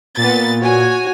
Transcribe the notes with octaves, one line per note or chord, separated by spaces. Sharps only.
A#2 B3 A6
F#4 C#5 G#5